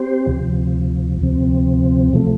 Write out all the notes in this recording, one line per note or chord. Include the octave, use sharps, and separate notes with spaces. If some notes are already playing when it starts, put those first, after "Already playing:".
Already playing: C4 G4 C5
D2 C3 F3
D2 C3 F3 C4
C3 F3 A3